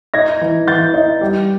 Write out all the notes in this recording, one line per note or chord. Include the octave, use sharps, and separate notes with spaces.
D#4 G#6 A#6
E3
E3 G6 A6
D#4
G3